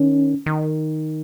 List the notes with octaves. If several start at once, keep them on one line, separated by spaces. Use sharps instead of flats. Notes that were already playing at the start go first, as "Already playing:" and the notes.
Already playing: D#3 C#4
D#3